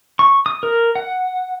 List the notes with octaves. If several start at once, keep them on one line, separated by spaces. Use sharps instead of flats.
C#6
D#6
A#4
F#5